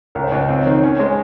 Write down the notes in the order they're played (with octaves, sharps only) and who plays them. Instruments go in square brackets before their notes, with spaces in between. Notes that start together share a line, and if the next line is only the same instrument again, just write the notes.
[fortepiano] C#2 [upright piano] A#4
[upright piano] C5
[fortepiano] C#2 [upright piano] D#5
[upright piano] F5
[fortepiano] C4 [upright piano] D#5
[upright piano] C#5
[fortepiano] D#3 [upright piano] C5
[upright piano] C#5
[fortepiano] C#4
[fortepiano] G#3 [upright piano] C5